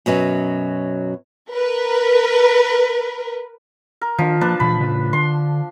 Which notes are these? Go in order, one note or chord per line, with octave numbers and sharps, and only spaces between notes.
F#2 B2 F#3 C#4
A#4 B4
A#4
D#3 F3 D4
F3 A#3 D4 B4 A5
D2 A#2 E3 B5
A2 C#3
D3 C6